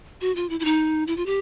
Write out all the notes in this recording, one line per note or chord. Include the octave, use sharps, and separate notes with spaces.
F#4
F4
E4
E4
D#4
E4
F4
G4